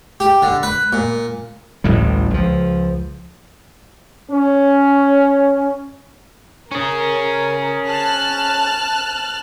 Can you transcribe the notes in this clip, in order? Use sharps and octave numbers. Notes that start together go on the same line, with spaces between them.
G4
D3
B4
A#2
A1 D2 A2 G3
C#2 F3
C#4
C#4 G#4 A#4
A5 F6 F#6